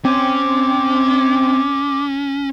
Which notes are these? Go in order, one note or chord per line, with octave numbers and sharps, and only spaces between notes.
C4 C#4 D6